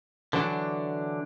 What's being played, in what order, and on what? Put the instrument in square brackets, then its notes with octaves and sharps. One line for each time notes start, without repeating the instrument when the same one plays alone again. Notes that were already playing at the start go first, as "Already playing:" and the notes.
[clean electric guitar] D3 E3 F#3 D4